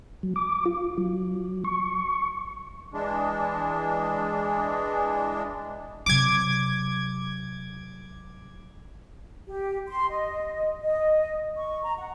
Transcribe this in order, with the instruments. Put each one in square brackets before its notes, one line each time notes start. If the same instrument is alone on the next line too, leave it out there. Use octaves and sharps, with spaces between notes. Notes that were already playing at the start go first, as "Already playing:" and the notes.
[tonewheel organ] F#3
D6
F4
F#3
C#6
[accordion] E3 G#3 D4
[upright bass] C3 F#3 [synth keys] D6 G#6
[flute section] G4
C6
D#5
D#5
C#6
A#5
F#5